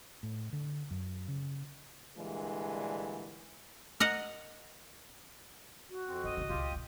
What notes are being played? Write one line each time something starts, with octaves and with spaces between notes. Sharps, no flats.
A2
D3
F#2
C#3
A#2 D3 E3 G3 G#3
A#4 D#5 F#5
F#4
F2 C4
D2 G#2 D#5
A#2 C#3
C#2 A#2 F4 G4
G#2 B2